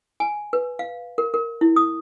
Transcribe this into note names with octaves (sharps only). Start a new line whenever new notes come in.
G#5
B4
F5
A#4
A#4
E4
D#6